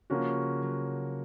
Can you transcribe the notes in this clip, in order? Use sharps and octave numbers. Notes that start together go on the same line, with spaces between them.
C#3 F3 A#3 C#4 F#4
F#3